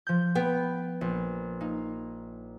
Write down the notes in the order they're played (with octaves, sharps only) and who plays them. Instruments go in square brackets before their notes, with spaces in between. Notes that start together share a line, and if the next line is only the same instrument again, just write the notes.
[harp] F3 G6
[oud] B3 [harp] G5
[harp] A#1
A#3 D#4